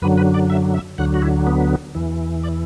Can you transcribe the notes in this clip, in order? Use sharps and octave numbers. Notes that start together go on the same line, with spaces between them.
F#2 D3 F#3 B4
B4
D5
E5
E5
D2 D3 F#3 F#5
F#4
E4
B3
E2 E3
D5